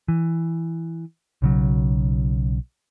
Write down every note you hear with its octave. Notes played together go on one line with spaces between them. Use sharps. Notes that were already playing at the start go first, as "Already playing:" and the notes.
E3
B1 C#3 F#3